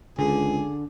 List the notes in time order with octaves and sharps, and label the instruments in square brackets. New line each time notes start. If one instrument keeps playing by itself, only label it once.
[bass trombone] C#2 [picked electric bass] D3 [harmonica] G#4